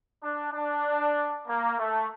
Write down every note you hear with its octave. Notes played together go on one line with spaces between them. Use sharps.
D4
D4
A#3
A3